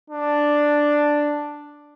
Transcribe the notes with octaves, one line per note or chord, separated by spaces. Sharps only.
D4